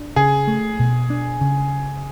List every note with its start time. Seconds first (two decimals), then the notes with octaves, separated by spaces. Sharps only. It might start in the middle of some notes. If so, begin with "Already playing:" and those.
Already playing: D4
0.16 C#3 G#4
0.48 A3
0.80 B2
1.10 D4
1.41 C#3